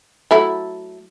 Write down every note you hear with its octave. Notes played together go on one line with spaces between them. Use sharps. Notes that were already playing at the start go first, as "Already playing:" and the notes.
F#3 A3 E4